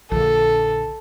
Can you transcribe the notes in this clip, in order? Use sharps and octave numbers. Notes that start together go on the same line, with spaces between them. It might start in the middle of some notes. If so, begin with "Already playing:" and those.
A#1 D3 A4